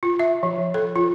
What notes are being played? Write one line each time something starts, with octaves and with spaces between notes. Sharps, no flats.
F4
E5
F3
A4
F4